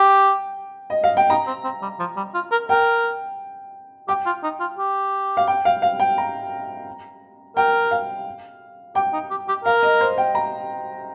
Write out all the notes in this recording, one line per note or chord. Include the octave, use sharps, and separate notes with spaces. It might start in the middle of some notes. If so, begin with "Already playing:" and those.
Already playing: G4 G5
D#5
F5
G5
D#4 A#5
C4
C4
G3
F3
G3
F4
A#4
A#4 G5
G4 G5
F4
D#4
F4
G4
F5
G5
F5
F5
G5
A#5
A#4 G5
F5
G4 G5
D#4
G4
G4
A#4 F5
D#5
C5
G5
A#5